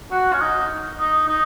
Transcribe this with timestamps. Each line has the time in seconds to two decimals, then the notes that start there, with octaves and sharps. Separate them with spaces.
0.11 F#4
0.33 C#4
0.41 D#4
0.99 D#4
1.28 D#4